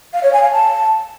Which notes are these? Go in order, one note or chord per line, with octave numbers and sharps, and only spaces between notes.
F5
C#5
G#5
F5
A5